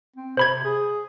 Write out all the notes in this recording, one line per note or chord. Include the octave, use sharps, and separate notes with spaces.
C4
C3 C5 B5 G#6
G#4